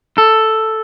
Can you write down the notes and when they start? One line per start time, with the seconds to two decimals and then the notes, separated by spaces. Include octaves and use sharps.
0.18 A4